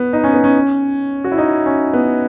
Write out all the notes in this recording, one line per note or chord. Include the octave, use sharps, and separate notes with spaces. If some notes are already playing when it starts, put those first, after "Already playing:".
Already playing: B3
D#4
C#4
B3
C#4
F#4
E4
D#4
C#4
B3